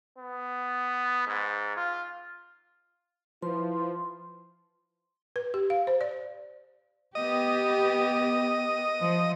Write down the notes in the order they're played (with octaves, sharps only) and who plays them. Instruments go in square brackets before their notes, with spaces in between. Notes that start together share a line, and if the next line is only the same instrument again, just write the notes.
[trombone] B3
G#2
F4
[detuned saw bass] F3 [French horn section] E4 B4 [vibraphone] C6
[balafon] B4
G4
F5
C5
D5
[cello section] B3 G4 [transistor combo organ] D#5
[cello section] F3